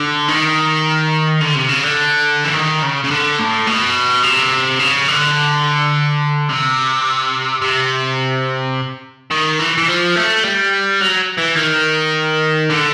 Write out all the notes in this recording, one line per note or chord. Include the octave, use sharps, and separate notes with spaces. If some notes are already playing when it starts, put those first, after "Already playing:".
Already playing: D3
D#3
D3
C3
C#3
D3
E3
D#3
C#3
C#3
D3
A2
B2
C3
C#3
D3
C3
C3
D#3
E3
E3
F3
A3
G3
F#3
E3
D#3
D3